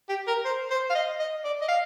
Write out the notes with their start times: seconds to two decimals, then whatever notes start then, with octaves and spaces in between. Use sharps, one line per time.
0.09 G4
0.27 A#4
0.45 C5
0.70 C5
0.90 F5
0.95 D#5
1.19 D#5
1.44 D5
1.61 D#5
1.68 F5